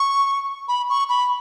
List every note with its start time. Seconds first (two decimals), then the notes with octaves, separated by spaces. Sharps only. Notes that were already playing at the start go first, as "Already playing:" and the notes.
Already playing: C#6
0.68 B5
0.89 C#6
1.09 B5